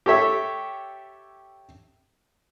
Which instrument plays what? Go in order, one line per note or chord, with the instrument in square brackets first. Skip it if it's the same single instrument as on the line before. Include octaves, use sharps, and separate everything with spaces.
[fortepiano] G4 A4 C#5 E5